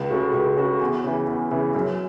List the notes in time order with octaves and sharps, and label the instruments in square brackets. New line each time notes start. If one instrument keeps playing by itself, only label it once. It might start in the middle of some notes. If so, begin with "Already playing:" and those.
Already playing: [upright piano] C#2
C#3 A3 F#4
C#2
C#3 A3 F#4
E2
C#3 E3
E2
C#3 E3
F#2